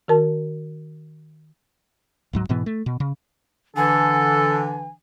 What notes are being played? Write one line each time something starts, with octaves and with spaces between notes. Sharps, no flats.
D#3 F#4 A#4 A5
D1 G#2 F#3
G#2 B2 E3 B3
A3
B2
C#3
D3 E3 D4 A4 G#5